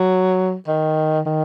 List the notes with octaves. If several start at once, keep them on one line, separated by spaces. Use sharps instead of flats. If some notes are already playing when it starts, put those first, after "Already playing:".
Already playing: F#3
D#3
D#3